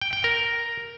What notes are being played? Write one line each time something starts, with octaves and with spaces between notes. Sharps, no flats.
G5
G5
A#4